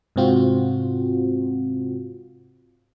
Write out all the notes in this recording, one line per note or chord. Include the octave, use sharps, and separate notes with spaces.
G#2 C3 C4 F4 F#4